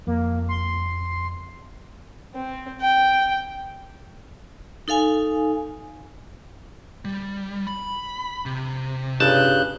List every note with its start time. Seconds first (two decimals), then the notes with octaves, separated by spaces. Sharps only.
0.07 F2 A#3
0.49 C6
2.35 C4
2.81 G5
4.88 D#4 A4 F5 G#5
7.05 G3
7.67 B5
8.46 C3
9.20 G1 C#3 A5 F#6 G6